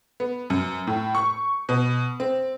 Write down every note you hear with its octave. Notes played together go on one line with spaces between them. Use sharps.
B3
F#2
A2
C#6
B2
C4